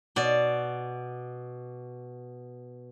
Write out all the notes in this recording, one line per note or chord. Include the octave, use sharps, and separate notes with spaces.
B2 D5